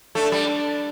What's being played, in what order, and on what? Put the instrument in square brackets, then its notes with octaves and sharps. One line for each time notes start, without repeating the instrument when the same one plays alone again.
[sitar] A3 [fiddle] D4
[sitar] G3